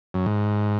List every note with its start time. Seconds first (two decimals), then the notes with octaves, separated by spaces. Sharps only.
0.14 F#2
0.26 G#2